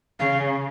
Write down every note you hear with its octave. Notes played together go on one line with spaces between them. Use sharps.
C#3 F5